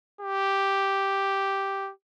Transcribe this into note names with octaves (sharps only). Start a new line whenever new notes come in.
G4